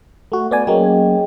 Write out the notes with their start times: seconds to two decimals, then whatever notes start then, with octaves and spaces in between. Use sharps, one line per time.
0.32 A3 F#4
0.51 B3 D5 G#5
0.67 F#3 A#3 C#4 G#4 D#5 G5